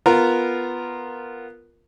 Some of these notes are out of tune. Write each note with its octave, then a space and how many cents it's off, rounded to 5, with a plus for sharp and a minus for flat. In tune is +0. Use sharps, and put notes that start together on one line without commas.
B3 +0 F4 +0 A#4 -5